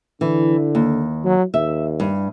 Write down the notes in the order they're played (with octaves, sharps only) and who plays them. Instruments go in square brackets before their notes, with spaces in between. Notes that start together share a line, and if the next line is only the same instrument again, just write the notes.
[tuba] D3 [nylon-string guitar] E3
[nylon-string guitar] D#2
[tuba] F#3
[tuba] D#2 [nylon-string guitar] E5
[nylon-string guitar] G2